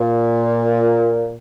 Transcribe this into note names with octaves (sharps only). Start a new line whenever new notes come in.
A#2